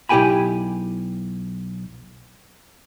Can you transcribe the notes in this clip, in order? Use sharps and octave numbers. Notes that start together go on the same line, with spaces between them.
B1 E4 G4 G5 G#5 B5